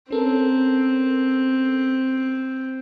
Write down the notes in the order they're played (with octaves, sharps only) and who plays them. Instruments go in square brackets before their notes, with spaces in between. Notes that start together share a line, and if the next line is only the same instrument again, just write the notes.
[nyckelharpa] C4 [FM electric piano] C#4 A4 A#4